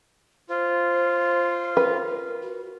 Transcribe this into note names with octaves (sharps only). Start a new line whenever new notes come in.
F4 C5
A#4 B4
F#4